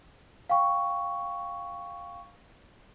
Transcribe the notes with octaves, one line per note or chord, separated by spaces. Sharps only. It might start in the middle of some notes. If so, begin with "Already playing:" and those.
F5 G5 C#6